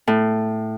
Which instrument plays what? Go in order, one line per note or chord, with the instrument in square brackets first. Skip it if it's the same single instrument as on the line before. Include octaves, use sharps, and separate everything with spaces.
[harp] A2